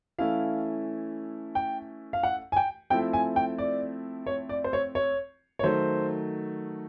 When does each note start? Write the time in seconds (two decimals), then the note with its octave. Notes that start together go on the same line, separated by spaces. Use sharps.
0.18 E3 A3 C#4 E4 F5
1.55 G5
2.13 F5
2.23 F#5
2.52 G#5
2.56 G5
2.90 F3 A3 C4 E4 G5
3.13 G#5
3.36 G5
3.58 D5
4.27 C#5
4.49 D5
4.64 C5
4.73 C#5
4.95 C#5
5.59 C#5
5.63 D#3 F#3 A3 C5